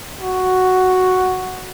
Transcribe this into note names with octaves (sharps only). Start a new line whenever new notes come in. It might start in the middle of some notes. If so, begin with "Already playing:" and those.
F#4